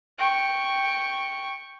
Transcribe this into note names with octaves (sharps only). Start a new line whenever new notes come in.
G5 C#6